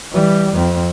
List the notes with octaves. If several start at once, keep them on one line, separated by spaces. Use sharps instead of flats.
E3 G3
F2 C4